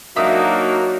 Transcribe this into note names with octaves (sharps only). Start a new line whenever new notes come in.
F#3 A#3 D4 D#4 F#4 E5 D#6